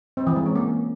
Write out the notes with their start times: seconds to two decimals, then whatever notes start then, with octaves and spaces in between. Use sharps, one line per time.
0.17 C4
0.27 E3
0.36 G#3
0.46 C#4
0.55 A#3